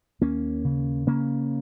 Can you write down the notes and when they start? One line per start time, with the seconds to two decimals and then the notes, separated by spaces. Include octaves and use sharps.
0.21 D#2 A#3 C#4
0.64 C#3
1.07 C#3 A#3 C#4